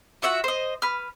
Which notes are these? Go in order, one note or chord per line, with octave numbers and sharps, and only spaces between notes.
F4 F#4 E5 F#5
C5 D#5
B4 F6